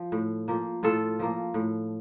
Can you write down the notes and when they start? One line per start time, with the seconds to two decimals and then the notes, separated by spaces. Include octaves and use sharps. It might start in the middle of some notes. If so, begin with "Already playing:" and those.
Already playing: F3
0.12 A2
0.48 F3 A#3
0.83 A2 F4 A4
1.19 F3 A#3
1.54 A2